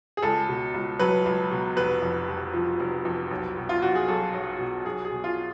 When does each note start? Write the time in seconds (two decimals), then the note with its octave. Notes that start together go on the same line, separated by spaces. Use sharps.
0.17 G#4
0.22 C#2 A4
0.48 B2
0.74 C#2
0.99 F#3 B4
1.26 C#2
1.51 B2
1.77 F1 B4
2.02 F2
2.28 F1
2.53 F3
2.80 F1
3.05 F2
3.31 B1
3.57 B2
3.69 F4
3.82 B1 F#4
3.95 G#4
4.08 F#3 A4
4.34 B1
4.59 B2
4.85 B1 G#4
5.05 G#4
5.11 B2
5.24 F4